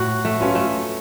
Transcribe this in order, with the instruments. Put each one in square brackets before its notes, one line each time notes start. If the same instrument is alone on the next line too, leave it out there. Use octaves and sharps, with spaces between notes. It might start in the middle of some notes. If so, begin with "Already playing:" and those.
Already playing: [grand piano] A2 [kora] F#4
[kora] A3
[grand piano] F#3 C#4 F4 B4
[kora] A3